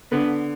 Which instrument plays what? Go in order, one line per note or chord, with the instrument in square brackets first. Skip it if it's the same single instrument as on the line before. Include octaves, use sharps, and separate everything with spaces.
[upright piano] D3 [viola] B3